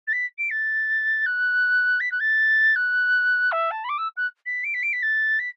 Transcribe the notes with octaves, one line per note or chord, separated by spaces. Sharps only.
A6
B6
D7
A6
F#6
B6
F#6
A6
F#6
E5
A5
B5
D6
E6
F#6
B6
D7
B6
D7
B6
A6
B6